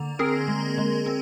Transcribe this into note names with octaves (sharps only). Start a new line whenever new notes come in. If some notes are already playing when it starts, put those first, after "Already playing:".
Already playing: D3 A#3
C4 G#4 A#4
G#3
G#3
C4